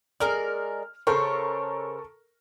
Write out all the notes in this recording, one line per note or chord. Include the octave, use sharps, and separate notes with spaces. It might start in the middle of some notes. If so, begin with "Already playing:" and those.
G#3 A#4 D5 F6
C#3 A4 A#4 C5 C#5 C#6